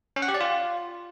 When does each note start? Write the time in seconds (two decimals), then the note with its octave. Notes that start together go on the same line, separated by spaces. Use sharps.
0.16 C#4
0.22 F#5
0.28 G4
0.34 D5
0.40 F4